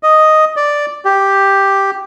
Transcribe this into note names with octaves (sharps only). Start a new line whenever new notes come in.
D#5
D5
G4